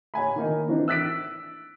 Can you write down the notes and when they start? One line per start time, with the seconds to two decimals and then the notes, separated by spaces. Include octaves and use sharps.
0.14 C#5 F#5 G#5 B5
0.36 D#3 A#3 D#4
0.68 E3 C4 D4 D#4
0.88 E6 F#6 A6 B6 D7